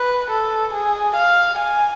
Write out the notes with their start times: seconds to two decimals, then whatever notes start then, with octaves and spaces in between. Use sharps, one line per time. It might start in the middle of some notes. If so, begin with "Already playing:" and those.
Already playing: B4
0.30 A4
0.73 G#4
1.16 F5
1.59 G#5